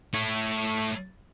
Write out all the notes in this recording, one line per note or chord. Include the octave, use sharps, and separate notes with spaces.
A3 C#5